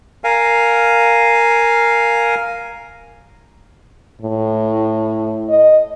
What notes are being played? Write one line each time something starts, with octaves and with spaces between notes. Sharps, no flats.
A#4 F5 G#5
A2
D#5